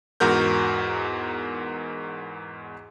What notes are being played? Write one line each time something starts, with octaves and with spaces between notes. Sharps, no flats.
E2 G#2 F#4 A#4 G6